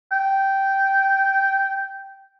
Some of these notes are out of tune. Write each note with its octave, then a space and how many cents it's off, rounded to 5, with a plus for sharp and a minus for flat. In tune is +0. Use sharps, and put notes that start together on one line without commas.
G5 -10